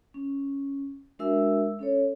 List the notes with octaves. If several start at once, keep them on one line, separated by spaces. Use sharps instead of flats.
C#4
G#3 D4 F#4 A#4 E5 E6
C#4 A4 C#5